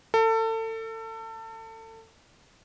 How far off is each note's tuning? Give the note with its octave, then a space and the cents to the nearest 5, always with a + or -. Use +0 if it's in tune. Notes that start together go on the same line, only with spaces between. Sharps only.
A4 +30